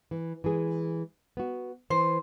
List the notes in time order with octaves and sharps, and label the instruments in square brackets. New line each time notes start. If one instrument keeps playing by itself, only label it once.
[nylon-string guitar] E3
E3 G#3 G#4
B3 F#4
[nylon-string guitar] E3 [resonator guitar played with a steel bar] C5